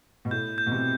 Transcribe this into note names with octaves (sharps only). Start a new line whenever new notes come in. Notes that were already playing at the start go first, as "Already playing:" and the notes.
B2
A2 G6
G6
B2
C3